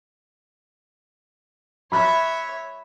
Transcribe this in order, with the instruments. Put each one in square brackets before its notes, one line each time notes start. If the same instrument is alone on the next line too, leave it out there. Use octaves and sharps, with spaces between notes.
[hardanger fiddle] C#5 E5 [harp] B5 F#6 A6